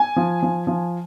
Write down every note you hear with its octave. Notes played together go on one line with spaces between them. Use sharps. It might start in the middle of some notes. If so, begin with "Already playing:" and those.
Already playing: G#5
F3
F3
F3